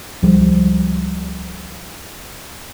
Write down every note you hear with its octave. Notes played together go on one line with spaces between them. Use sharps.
C#2 F3 G3